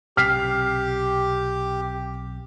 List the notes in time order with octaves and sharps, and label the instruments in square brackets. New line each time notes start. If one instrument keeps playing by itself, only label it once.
[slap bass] B1 C3 C4 [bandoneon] G4 [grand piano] F6 B6 C7